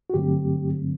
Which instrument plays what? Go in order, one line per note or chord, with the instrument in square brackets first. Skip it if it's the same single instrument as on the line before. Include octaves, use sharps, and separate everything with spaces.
[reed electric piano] F#4
G2 D3 F#3 A3 C4 G4